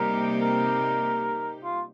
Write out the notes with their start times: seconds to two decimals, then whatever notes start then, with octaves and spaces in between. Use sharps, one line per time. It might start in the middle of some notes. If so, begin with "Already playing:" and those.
Already playing: C3 G3 A#3 D#4 G4 A#4
0.42 A#4
1.64 F4